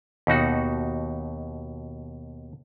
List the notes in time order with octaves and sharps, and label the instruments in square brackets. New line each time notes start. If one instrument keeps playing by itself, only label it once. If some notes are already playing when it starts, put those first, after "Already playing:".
[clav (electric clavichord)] D#2 B2 D#4 F#4